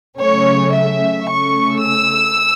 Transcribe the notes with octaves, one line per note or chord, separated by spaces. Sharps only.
C#3 F#3 A3 C#4 C#5
E5
C#3 A3 C#4 C#6
E6